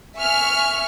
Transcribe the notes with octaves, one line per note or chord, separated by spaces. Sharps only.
E5 G#5 C#6 F6